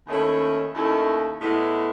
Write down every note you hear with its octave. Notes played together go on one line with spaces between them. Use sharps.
D#2 D#3 A3 C#4 E4
D#2 D#3 A3 C#4 E4
A2 G#3 B3 E4